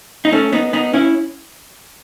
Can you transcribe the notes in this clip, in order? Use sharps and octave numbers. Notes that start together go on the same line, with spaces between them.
D#4
A3 C#4
B3 D#4
B3 D#4
C#4 E4